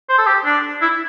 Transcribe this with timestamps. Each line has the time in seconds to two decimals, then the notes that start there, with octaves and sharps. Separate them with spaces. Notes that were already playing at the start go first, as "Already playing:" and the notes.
0.09 C5
0.18 A4
0.27 G4
0.45 D4
0.82 E4